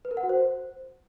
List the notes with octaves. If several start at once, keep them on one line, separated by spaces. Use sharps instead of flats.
B4
A#4
F#5
F#4
C5